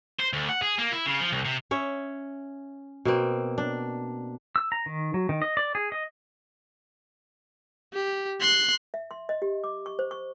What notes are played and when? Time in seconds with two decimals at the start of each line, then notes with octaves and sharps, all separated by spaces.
0.20 C5
0.33 D2
0.49 F#5
0.62 G#4
0.79 A#3
0.92 E4
1.06 C#3
1.20 F3
1.32 C2
1.45 C3
1.71 C#4 C#5 E5
3.05 B2 A#3 C4
3.58 D4
4.56 E6
4.72 A#5
4.86 D#3
5.14 F#3
5.29 D#3
5.42 D#5
5.57 D5
5.75 G#4
5.92 D#5
7.94 G4
8.41 C6 F#6
8.94 E5
9.11 C6
9.29 D#5
9.42 G4
9.64 D6
9.86 C#6
9.99 C5
10.11 C#6